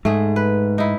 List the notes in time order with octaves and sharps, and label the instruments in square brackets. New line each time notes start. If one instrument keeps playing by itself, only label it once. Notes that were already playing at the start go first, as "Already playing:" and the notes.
[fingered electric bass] G#2 [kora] A3 G#4
[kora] B4
D#4 E4